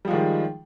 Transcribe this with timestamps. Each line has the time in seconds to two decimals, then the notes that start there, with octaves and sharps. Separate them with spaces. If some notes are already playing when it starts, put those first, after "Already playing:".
0.05 G3
0.08 F3
0.10 G#3
0.13 D#3